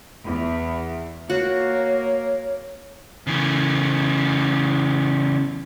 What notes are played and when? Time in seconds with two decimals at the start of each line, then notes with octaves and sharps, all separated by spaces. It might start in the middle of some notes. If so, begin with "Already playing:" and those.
0.24 E2
1.30 A#3 F#4 C#5
3.27 C#3 E3